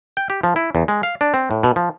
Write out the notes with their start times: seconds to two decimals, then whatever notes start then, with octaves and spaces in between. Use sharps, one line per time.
0.17 G5
0.30 G4
0.43 F3
0.56 E4
0.75 E2
0.88 G#3
1.03 F5
1.21 D4
1.34 C4
1.51 A2
1.63 B2
1.76 F3